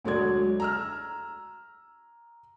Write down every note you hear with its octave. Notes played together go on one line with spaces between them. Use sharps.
D2 F#3 G#3 D5 G#6
A#5 E6 F6